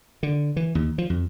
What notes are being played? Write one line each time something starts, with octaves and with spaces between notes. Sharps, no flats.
D3
E3
D#2
F3
F2